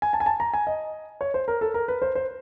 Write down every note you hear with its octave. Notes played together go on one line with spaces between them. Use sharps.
G#5
A5
G#5
A5
A#5
G#5
D#5
C#5
C5
A#4
A4
A#4
B4
C5
C5